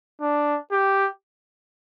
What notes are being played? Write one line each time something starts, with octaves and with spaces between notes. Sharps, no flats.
D4
G4